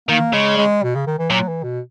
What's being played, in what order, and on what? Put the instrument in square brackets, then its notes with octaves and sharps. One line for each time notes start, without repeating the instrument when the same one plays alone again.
[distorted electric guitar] D#3 [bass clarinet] A#3
[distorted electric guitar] C#3 [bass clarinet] G#3
[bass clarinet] G#3
B2
C#3
D#3
E3
[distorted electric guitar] A#2 [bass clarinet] F#3
[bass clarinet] E3
B2